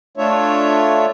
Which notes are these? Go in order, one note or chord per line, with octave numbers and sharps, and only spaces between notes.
A3 D4 F4 C#5 E5